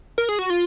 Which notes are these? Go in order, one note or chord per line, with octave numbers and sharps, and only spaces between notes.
A#4
G#4
F#4
F4